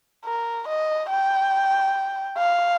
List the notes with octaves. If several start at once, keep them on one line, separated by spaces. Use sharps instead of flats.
A#4
D#5
G5
F5